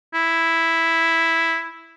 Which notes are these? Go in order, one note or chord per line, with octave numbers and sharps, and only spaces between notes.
E4